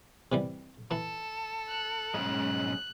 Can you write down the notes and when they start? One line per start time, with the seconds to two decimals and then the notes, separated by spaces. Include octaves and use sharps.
0.32 C3 E3 G3
0.91 E3 A4
1.68 F#6
2.14 B1 G#2 G#3 C#4